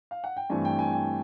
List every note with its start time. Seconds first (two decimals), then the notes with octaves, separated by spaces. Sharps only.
0.11 F5
0.24 F#5
0.37 G5
0.50 G2 E3 A3 C4 G#5
0.65 G5
0.79 G#5
0.93 G5